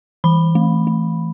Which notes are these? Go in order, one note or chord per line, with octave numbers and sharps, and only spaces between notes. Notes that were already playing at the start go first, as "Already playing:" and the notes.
E3 B5
A3
A3